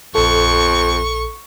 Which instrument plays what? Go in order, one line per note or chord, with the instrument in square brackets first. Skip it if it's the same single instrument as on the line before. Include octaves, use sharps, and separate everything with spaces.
[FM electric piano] A#1 A4 [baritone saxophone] F2 [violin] C#6